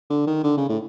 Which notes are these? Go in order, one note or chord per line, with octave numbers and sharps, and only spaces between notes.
D3
D#3
D3
C#3
A2